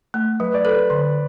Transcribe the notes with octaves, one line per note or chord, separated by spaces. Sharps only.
A3
F#3 B4
D5
A4 B4
D3